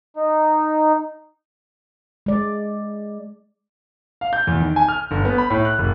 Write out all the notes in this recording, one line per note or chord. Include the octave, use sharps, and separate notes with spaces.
D#4
G#3 D5
F5
G6
E2
D#3
G#5
F6
G1
B3
B5
A2
F#6
F#1